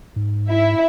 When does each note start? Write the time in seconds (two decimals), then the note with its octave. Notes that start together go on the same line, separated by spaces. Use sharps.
0.16 G#2
0.50 E4 E5